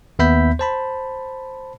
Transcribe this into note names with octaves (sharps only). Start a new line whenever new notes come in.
D#2 B3 E5 B5 G6 B6
C5 A5 B5